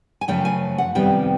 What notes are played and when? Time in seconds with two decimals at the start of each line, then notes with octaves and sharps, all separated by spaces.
0.21 G#5
0.28 F#2 C#3 F3 A3 C#4 G5
0.45 G#5
0.78 F#5
0.95 F2 C3 D#3 G3 B3 G5